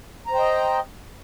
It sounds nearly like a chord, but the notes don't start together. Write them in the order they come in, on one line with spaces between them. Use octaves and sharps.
A#5 C5 G5 D#5